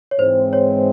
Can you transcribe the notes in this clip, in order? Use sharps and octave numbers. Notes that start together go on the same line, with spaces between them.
C#5
G#2 E3 G#3 C4 C5
C#5